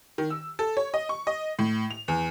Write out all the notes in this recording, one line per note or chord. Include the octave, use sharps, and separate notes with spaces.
D#3
E6
A4
C#5
D#5
C#6
D#5
A2
F7
E2